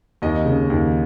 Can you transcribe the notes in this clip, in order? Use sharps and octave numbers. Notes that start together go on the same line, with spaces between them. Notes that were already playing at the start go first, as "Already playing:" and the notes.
D#2 D#5
C#3
D#2